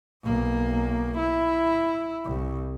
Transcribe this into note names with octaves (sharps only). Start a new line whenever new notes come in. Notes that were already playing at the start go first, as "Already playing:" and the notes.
B1 A#3
E4
C2